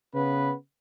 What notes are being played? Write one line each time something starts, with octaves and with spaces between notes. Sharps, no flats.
C#3 B3 B4